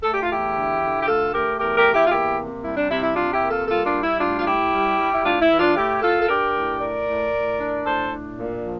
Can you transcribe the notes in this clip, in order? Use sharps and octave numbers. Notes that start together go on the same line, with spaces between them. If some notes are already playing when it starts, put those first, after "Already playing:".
A3 A4
G4
F4
E2 E4 G4
D3
D3
G4
A3 F4 A4
A3 G4 A#4
E2 G4 A#4
G4 A#4
E2
E4 G4
F4
A#3 E4 G4
C3
G3 E4
D4
C3 E4
E4
C3 D4 F4
E4 G4
A#3
F4 A4
G3 F4 A4
D4 F4
G3
E4
A2 D4 F4
F4
A2 E4 G4
G3
G3
E4
A2 D4 F4
E4
E3
D4 F4
A2 E4 G4
A2 F4 A4
A4
D4 G4 A#4
A2
A2 A#4 D5
A2
A2
D4
A2 A4 C5
D4
A#2
F3